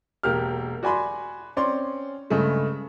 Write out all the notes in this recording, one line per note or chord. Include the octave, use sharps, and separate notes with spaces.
E1 A#3 G4 F6
F#4 D5 G#5 B5 C6
C4 C#4 D5 C6
G2 C#3 G#3 A3